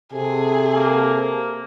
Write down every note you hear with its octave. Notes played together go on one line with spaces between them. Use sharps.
C3 G#4 A4
A#3